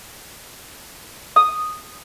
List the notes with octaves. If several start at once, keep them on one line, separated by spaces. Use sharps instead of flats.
D#6